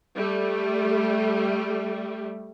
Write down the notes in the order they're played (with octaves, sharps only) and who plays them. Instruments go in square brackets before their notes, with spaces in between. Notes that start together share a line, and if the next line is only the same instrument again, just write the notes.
[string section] G3 A3